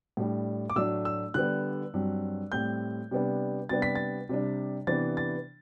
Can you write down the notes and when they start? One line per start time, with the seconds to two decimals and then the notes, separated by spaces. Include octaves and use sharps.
0.17 A2 G3 D4
0.70 D6
0.76 A2 F#3 A3 D4 E6
1.05 E6
1.34 D3 G3 B3 F#6
1.94 G2 F#3 C4
2.52 A2 G3 C4 G6
3.11 C3 G3 B3 D4
3.69 C3 G3 B3 D4 A6
3.82 B6
3.95 A6
4.29 C3 G3 D4
4.87 C3 E3 B3 D4 A6
5.17 A6